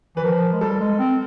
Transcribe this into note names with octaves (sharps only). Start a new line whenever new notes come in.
E3 B4
F3 A#4
G#3
G3 A4
G#3
C4